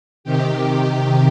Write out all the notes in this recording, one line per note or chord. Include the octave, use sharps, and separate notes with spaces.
C3 D#3 G4